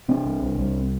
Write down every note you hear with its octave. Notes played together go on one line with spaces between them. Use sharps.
C3 C4 D4
C2
C2
C2